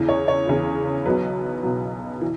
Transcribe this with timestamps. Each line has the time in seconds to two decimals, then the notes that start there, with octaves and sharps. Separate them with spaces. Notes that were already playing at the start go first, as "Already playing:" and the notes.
Already playing: E2 C#3 E3
0.09 C#5
0.28 C#5
0.47 E2 C#3 E3
1.05 B1 B2 F#3 B4
1.63 B1 B2 F#3
2.21 E3